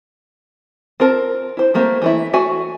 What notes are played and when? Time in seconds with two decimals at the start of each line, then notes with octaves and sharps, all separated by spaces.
1.00 C4 F4 A#4 A5
1.57 E4 C5
1.74 G3 A3 A#3 C4 G4
2.02 E3 A3 E4
2.33 A3 F#4 E5 G#5